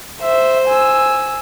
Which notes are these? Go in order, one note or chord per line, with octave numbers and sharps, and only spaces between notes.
C5 E5
G#5 E6